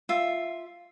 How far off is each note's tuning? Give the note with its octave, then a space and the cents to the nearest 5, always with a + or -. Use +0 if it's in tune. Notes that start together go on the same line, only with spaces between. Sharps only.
F4 -5 E5 +0